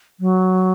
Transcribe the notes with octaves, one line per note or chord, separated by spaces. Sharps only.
F#3